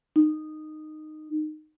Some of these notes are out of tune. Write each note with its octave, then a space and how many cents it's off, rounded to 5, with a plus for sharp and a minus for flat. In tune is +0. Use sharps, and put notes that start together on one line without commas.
D#4 -15